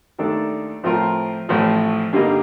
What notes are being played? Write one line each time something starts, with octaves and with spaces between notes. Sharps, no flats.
D#2 D#3 A3 D4 A4
A2 F3 C4 F4 A#4
A1 A2 F3 C4
G2 D3 G3 A#3 D#4